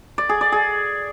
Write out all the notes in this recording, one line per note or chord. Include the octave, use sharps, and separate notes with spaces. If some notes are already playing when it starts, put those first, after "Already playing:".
D5
G#4
D5
G#4